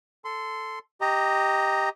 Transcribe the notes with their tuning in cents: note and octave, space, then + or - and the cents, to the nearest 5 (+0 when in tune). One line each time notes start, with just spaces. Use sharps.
A4 +0 C6 -15
G4 +0 D#5 +5 A#5 -10